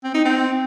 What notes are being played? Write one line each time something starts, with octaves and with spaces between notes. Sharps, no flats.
C4
D#4
C4